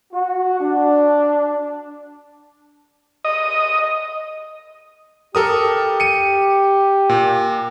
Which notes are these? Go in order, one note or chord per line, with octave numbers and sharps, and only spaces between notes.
F#4
D4
D#5
G4 A4 A#4 D#6
C#7 D#7
A#2